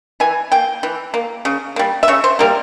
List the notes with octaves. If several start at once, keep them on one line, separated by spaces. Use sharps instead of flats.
E3 G#5
A#3 G5
E3
A#3
C#3
G3 A#3
E5
C#3 C#5
C5
G3 A#3 A#4